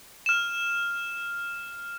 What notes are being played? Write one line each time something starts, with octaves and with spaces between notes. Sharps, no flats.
F6 E7